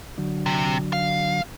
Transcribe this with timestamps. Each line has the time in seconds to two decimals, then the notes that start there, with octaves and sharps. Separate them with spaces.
0.18 D3 F#3
0.46 C3
0.93 F5